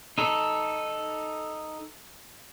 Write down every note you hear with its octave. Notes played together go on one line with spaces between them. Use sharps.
D#4 A4